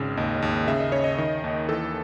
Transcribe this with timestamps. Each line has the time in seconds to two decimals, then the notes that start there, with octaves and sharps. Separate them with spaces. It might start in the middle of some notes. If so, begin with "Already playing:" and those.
Already playing: G#1 C#3
0.17 D#2 D#5
0.42 D#2
0.67 C#3 E5
0.80 D#5
0.92 C#3 C#5
1.04 D#5
1.18 D#3
1.44 D#2
1.69 E3 A4